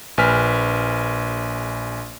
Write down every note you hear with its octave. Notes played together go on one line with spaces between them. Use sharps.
A#1 B4 G#5 F6 B6